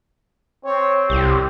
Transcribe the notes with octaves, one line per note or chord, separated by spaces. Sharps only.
C4 C#5
C2 G4